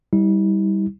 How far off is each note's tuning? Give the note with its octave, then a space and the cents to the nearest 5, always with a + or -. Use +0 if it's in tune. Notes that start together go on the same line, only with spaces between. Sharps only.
G3 +0 E4 -40